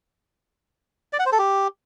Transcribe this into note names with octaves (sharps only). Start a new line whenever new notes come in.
D5
F#5
C5
A4
G4